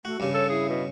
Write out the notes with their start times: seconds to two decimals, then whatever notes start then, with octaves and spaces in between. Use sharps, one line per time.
0.05 A3 F#4
0.20 G2 C#3 G4
0.34 A4 C#5
0.49 E4 G#4
0.69 B2